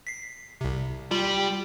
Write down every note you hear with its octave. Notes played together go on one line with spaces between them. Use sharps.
B6 C7
C2 C3
G3 F4